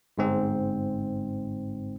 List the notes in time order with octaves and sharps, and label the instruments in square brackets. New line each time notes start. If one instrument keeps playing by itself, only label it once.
[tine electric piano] G1 G#2 C4